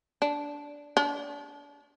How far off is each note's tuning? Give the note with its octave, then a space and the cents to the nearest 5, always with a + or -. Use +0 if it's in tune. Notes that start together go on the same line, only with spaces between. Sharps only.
D4 -10
D4 -30